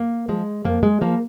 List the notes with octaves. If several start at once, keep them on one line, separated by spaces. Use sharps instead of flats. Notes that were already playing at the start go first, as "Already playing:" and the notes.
Already playing: A#3
F3 G#3
F2 A#3
G#3
F3 A#3